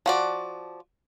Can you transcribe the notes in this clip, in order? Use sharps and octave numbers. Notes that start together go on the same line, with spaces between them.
F3 F#4 D5